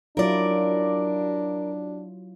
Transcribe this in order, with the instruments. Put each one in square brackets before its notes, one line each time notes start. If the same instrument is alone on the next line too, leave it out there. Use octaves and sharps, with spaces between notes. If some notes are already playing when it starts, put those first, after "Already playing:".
[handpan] F#3 E4 F4 [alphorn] D4 [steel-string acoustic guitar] A#4 D5